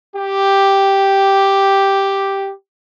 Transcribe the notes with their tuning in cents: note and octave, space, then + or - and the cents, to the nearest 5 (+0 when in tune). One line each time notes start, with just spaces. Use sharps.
G4 +0